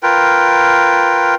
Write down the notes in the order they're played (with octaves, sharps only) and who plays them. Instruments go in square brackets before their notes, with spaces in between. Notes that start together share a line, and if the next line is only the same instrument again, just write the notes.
[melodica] F4 A#4 B4 G5